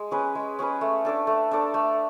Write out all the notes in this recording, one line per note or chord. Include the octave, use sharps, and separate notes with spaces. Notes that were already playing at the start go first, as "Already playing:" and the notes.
Already playing: G#3
C#4 G#4 B4
G#3
C#4 G#4 B4
A3
D4 A4 D5
A3
D4 A4 D5
A3